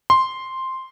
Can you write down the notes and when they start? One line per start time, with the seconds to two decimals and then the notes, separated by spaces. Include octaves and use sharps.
0.10 C6